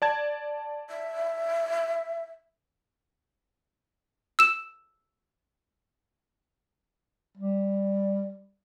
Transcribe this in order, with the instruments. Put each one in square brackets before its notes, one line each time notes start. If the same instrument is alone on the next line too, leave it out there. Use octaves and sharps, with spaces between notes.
[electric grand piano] D5 A5 G#6
[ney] E5
[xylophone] E6 E7
[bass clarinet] G3